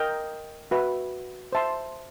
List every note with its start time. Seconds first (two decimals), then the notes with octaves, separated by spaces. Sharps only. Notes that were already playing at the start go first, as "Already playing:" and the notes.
Already playing: A#4 D#5 G5
0.71 F#4 B4 E5
1.52 C5 E5 A5 C6